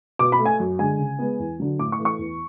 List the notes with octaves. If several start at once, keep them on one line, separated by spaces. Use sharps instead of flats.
B2 D6
B5
A3
G#5
F#2
D3 G#3 G#5
C#3
G#3 B3
E2
D3 F#3
A2 D6
C#6
E3 A3
C#6
E2